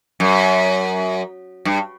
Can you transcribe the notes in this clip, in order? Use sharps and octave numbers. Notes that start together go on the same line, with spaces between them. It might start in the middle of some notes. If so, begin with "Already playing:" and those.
F#2
G2